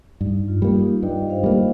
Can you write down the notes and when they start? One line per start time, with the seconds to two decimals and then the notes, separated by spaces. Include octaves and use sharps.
0.21 G2 D#4
0.48 F4
0.62 G3 A#3
0.75 D#4 G4
1.02 G2 D#5 G5
1.30 C5 F5
1.43 G3 A#3